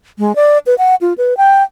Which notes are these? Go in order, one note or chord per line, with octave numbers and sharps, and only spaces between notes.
G#3
D5
B4
F#5
F4
B4
G5